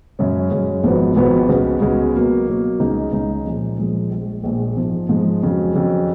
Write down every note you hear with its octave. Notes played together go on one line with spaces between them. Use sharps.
F#2 C#3 G#3 C#4
F#2 C#3 G#3 C#4
G#1 G#2 F3 B3 F#4
G#1 G#2 F3 B3 F#4
C#2 C#3 G#3 B3 F#4
C#2 C#3 G#3 B3 F#4
B2 F#3 A#3
B2 F#3 A#3
C#2 C#3 G#3 D#4
C#2 C#3 G#3 D#4
A#2 F3 G#3
A#2 F3 G#3
A#1 A#2 G#3
A#1 A#2 G#3
G#2 F3 G#3
G#2 F3 G#3
F2 C#3 F#3
F2 C#3 F#3